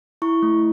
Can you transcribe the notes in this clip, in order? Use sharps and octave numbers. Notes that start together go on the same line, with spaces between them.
E4 C#6
A3